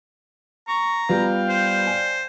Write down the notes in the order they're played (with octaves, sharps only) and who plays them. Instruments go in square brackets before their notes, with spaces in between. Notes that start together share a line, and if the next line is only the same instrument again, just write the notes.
[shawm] A#5 [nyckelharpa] C#6
[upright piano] G3 B3 F4 [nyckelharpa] F5 G5
[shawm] C5
[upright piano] D5 G#5